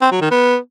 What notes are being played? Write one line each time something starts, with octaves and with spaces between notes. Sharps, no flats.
C4
F#3
D#3
B3